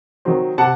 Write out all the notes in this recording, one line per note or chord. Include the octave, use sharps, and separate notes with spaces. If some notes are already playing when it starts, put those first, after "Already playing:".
D#3 F#3 C4
C3 F#5 A5